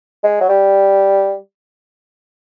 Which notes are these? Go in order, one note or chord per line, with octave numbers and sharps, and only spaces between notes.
G#3
F#3
G3